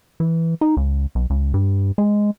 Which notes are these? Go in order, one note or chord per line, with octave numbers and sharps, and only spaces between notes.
E3
D#4
C#2
B1
C#2
G2
G#3